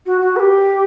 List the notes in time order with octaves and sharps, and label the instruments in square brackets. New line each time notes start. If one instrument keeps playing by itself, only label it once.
[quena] F#4
F#4
B4
G4